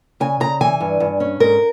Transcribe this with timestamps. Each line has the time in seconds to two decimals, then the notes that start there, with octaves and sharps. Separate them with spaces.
0.20 C#3 G#5
0.40 C#3 A#5
0.61 E3 G#5
0.81 G2
1.00 G2
1.20 C#4
1.40 G#2 A#4